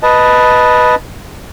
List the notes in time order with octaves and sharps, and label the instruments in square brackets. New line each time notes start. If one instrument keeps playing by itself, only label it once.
[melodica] B4 D#5 A5